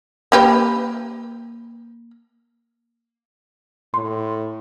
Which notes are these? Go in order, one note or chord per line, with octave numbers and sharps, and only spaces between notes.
A#3 G4 B4
A2 C6